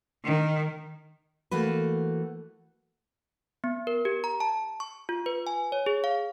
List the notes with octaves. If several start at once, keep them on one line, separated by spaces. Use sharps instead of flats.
D#3
E3 A3 A#3 F#4 B4
B3
A#4
G4
A#5
A5
C#6
F4
B4
G#5
C#5
G#4
F5